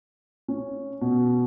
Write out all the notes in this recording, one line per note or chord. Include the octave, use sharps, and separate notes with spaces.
C#4
B2